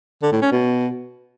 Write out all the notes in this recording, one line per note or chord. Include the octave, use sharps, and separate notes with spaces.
D3
A2
C#4
B2